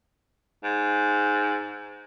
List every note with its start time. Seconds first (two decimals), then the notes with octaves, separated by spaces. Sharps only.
0.64 G#2